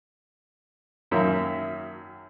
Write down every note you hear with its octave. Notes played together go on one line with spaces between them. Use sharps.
G#1 F#2 D#3 A#3 C#4 E5